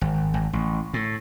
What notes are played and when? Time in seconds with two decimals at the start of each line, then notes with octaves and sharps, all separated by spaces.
0.01 G#1
0.34 G#1
0.53 A1
0.94 A2